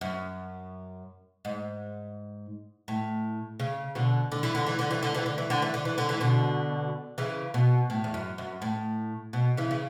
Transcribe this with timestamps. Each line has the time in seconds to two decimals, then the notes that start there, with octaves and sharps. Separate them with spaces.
0.01 F#2
1.45 G#2
2.88 A2
3.60 C#3
3.95 B2 D3
4.32 D3
4.43 E3
4.55 D3
4.67 E3
4.79 D3
4.91 E3
5.03 D3
5.14 E3
5.26 D3
5.38 E3
5.50 D3
5.62 E3
5.74 D3
5.85 E3
5.98 D3
6.09 E3
6.21 B2 D3
7.18 C#3 E3
7.54 B2
7.90 A2
8.04 E2
8.14 F#2
8.38 F#2
8.62 A2
9.33 B2
9.57 C#3 E3
9.71 C#3